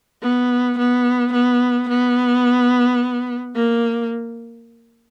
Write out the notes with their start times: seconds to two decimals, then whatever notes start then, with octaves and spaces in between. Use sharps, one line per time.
0.22 B3
0.77 B3
1.32 B3
1.88 B3
3.55 A#3